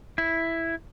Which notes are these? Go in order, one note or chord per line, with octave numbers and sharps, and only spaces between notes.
E4